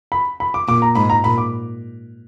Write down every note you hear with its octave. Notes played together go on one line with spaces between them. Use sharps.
B5
B5
D6
A#2 D6
A#5
G#2 B5
A#5
A#2 B5
D6